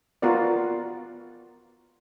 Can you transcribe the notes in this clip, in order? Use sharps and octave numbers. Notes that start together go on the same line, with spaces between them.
B3 F4 F#4 A#4 D5